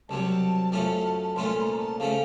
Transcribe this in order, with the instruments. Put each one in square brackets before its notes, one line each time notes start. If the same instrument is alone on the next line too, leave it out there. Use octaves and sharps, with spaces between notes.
[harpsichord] C2 C3 F#3 [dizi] A5
[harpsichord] F#2 F3 A3 C#4 F4
[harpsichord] C2 A#2 A3 C#4 F4 [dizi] C6
[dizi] C6
A#5
A5
[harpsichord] C#3 F3 A3 C#4 [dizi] F5